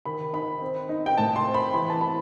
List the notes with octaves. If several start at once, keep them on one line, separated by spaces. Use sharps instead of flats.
D#3 B5
D#4 B5
C4
D#4
G5
A2 A5
C6
C4
B5
E3 B5
A5
E3 B5